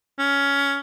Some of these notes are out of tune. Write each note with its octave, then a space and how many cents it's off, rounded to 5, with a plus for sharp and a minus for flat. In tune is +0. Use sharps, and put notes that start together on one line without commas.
C#4 +15